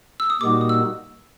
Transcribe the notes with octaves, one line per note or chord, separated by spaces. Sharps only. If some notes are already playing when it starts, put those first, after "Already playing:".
E6
D#6
A#2 G3 A#3 D#4 F#4 D6
D#6
E6